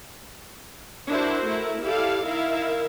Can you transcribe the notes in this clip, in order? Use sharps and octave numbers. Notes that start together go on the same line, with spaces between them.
D4 E4 F#4 A#4 C5
A3 E4 A#4
E4 G4 A4 D5 F5
D#3 E4 A#4 E5 F5